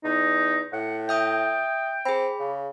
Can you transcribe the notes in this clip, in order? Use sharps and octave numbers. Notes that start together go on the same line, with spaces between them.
E2 D#4
A2 F#5
E5 G5 D#6 G6
C4 G#4 B5
C#3